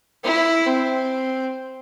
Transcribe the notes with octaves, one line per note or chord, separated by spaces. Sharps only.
E4
C4